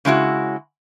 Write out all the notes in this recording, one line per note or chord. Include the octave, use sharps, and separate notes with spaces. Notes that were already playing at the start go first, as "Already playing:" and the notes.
C#3 G#3 E4 F#4